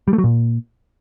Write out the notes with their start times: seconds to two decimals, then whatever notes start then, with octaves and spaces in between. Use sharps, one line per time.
0.08 G3
0.13 A3
0.18 F#3
0.24 A#2